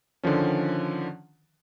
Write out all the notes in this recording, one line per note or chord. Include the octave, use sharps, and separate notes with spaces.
D3 D#3 F3 C#4